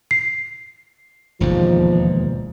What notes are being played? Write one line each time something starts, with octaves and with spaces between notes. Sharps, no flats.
C7
E1 D#2 G#2 F3